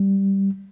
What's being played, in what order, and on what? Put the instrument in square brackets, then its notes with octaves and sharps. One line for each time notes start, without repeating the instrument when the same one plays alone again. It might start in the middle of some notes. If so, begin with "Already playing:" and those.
Already playing: [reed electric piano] G3